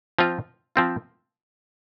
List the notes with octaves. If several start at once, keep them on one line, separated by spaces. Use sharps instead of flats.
F3 C4 F4
F3 C4 F4